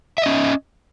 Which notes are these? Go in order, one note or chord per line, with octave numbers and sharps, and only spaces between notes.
C#4 D#5 E5